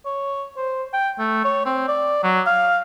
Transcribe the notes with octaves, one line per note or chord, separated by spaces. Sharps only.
C#5
C5
G5
A3
C#5
C4
D5
F#3
F5